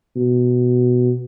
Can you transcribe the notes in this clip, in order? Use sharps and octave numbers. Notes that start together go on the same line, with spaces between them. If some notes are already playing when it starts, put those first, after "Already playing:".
B2